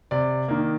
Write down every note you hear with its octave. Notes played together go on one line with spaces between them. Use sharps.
C3 D5
D#3 A#3